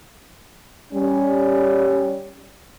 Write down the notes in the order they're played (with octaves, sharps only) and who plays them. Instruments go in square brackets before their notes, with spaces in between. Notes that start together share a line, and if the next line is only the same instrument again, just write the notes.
[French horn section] G3 C#4